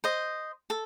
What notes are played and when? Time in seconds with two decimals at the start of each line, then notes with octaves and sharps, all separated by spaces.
0.04 C5 D#5
0.70 A4